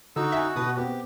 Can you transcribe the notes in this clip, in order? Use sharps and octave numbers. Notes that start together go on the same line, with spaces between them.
D3 D#4 F#4 E6
E5 F#5 G#5
B2 B4 D#6
B3 C4 G4